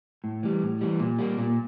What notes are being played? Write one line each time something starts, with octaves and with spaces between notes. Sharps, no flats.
A2
E3 G3
A2
E3 G3
A#2
G3 A#3
A#2